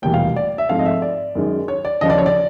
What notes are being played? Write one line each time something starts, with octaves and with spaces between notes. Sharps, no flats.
F1 E2 B2 G3 A#3 G5
F5
D5
E5
G#2 F3 A3 C4 F5
D#5
E5
D5
F#2 D#3 G#3
C#5
D5
D#2 C#3 F3 D#5
D5
C#5
D5